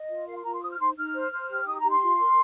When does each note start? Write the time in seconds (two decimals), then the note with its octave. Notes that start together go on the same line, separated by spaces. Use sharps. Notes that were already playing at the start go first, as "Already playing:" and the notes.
Already playing: D#5
0.09 F4
0.27 A#4 F5
0.35 C6
0.44 F4 A#5
0.53 C6
0.61 C5 D#6
0.70 F6
0.79 D#4 C6
0.97 D#4 F6
1.14 C5
1.31 C5
1.49 G4
1.66 D#4 D#6
1.78 A#5
1.84 G4
1.90 C6
2.02 F4
2.20 A#4